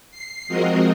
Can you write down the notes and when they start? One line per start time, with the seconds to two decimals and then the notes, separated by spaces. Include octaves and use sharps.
0.11 C7
0.48 F3 G#3 C4 F#4 A#4 D#5